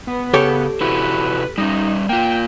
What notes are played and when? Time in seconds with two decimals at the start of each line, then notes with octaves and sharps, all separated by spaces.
0.07 B3
0.34 C#3 B3 G4 A4 C#5
0.81 C3 E4 F#4 B4
1.58 G3 C#4 D#4
2.09 A#3 F4 G5